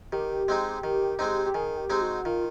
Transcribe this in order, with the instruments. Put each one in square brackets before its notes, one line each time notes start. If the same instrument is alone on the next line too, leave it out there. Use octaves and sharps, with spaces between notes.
[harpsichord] D#3 [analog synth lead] G4
[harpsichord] G#3 C4 D#4
D#3
G#3 C4 D#4
[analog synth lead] G4
[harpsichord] D#3 [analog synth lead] G#4
[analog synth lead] G4
[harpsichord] G#3 C4 D#4
[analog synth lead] F#4
[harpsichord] D#3 [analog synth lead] F4